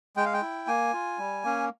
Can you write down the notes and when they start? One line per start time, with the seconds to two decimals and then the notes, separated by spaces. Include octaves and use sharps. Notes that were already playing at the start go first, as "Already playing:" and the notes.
0.17 G#3 G5
0.25 F5
0.34 G5
0.42 E4
0.67 A#3 G#5
0.93 F4
1.18 G3
1.44 A#3 C#4